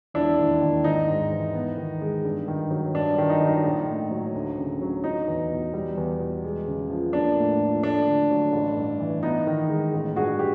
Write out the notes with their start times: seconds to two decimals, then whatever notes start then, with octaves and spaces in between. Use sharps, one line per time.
0.14 E1 D4 E4
0.39 D#2
0.61 D#3
0.84 G#1 D#4
1.08 G#2
1.32 E3
1.54 B3
1.77 D#3
2.02 G#3
2.24 G2
2.48 D#3
2.71 F#3
2.94 G2 D4
3.18 D#3
3.30 D#4
3.41 F#3
3.47 D#4
3.64 A#1
3.88 A2
4.11 F#3
4.35 D2
4.58 C#3
4.81 F#3
5.04 F#3 D#4
5.28 E2
5.51 B2
5.74 G3
5.97 E2
6.20 B2
6.44 G#3
6.67 C#3
6.90 F3
7.13 A#3 D4
7.36 A2
7.60 F3
7.83 A3 D4
8.07 D3
8.30 F#3
8.53 A1
8.77 G2
9.00 E3
9.23 B3 D#4
9.47 D#3
9.69 G#3
9.94 A1
10.16 G2 F#4 G#4
10.39 G4